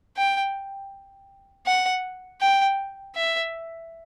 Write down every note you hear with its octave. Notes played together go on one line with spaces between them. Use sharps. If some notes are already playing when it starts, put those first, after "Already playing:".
G5
F#5
G5
E5